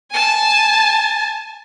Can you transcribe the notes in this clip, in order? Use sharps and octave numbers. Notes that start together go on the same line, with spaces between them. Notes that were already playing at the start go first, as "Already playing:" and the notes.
G#5 A5